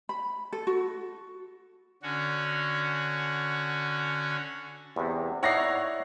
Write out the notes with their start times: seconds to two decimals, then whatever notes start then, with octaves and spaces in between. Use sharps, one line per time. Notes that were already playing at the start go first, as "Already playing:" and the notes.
0.09 B5
0.53 A4
0.67 F#4
2.03 D3 C#4 F#4
4.96 E2 G2 C3
5.43 D#4 E4 C#5 D5 F#5 A#6 C7